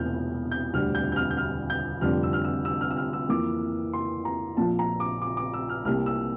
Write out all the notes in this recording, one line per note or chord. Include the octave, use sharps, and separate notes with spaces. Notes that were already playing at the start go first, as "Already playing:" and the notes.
Already playing: E1 E2 C3 E3 A3 F6 G6
G6
E1 D2 D3 G3 F6
G6
G6
F6
G6
F6
G6
F1 F2 D3 G3 F6
E6
F6
E6
E6
F6
E6
F6
E6
F2 E3 A#3 D6
C6
A#5
A#1 A#2 F3 A5
A#5
D6
D6
D6
E6
F6
C2 C3 G3 A#3 F6
E6